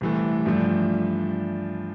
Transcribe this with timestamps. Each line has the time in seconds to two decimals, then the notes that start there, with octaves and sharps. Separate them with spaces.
0.01 C2 C3 E3 A3
0.46 G2 F3 A3 D4